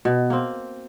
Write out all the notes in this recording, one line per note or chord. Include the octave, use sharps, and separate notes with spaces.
B2
A#3 C4